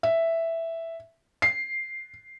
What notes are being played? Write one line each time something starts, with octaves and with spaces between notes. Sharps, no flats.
E5
C7